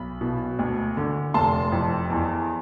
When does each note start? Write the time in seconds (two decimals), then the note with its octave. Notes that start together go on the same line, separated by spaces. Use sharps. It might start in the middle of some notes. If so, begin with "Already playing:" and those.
Already playing: B1 B5
0.21 B2
0.59 D2
0.97 D3
1.34 F1 A5 C6
1.72 F2
2.10 E2